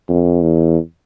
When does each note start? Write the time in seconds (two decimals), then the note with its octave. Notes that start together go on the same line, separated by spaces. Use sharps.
0.09 F2
0.42 E2